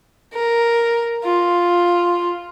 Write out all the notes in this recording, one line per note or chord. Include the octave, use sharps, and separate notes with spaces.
A#4
F4